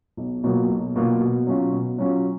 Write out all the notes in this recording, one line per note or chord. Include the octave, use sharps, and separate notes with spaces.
B1
B2 F#3 A#3 F4
B1
B2 F#3 A#3 F4
B2
F#3 C#4 F4
B2
F#3 C#4 F4